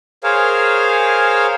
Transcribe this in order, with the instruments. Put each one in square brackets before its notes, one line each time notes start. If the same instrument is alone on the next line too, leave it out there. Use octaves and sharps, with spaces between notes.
[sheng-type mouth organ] G#4 A#4 C5 C#5 F5